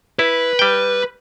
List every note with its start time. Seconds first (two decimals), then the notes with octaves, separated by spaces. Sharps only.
0.19 E4 B4
0.59 G3 G5